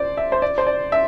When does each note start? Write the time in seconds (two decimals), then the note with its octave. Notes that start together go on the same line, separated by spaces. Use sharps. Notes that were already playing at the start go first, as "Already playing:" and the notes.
Already playing: C5 D5
0.17 E5
0.32 C5
0.42 D5
0.58 C5
0.67 D5
0.92 E5